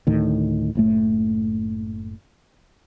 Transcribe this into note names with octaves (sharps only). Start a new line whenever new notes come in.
D2 A2 D#3
F#1 A2 A3